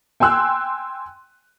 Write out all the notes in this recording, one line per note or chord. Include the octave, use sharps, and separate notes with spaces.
G5 G#5 C6 E6 F#6